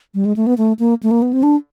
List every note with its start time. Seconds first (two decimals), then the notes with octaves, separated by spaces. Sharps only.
0.14 G3
0.25 G#3
0.36 A3
0.47 B3
0.58 A3
0.79 A#3
1.03 A3
1.11 A#3
1.22 B3
1.33 C4
1.43 D4